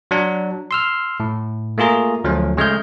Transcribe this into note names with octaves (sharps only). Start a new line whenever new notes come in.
F#3 D4
C6 E6 F6
A2
A3 A#3 F4 G#4 A#5
D2 F3 F#3 A3 C#4
C#3 G#3 A3 F6 G6